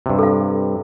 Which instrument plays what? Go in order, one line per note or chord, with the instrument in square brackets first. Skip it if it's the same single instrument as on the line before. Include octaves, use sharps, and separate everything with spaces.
[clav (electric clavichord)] G2 C3
[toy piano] A4 F5